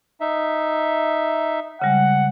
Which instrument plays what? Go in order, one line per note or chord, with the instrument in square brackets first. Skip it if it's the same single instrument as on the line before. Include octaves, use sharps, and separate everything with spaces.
[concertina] D#4 E5
[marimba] C#3 G3 G#3 [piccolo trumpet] F#5